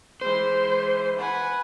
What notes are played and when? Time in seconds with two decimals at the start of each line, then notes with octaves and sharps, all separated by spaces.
0.21 E3 G#3 C5
1.18 B4 F#5 G#5